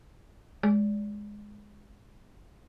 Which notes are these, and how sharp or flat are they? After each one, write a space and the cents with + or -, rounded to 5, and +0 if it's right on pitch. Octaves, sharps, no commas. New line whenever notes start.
G#3 +0 D5 -30